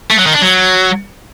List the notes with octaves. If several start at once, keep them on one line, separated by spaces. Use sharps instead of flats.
A3
F#3
D#3
D4
F#3